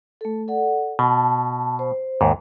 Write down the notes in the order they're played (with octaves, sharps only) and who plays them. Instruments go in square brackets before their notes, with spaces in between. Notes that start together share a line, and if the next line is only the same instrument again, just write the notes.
[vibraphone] A3 A4
A4 D5 F#5
[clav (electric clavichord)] B2 [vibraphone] A5
[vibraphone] C5
[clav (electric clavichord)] D#2 G#2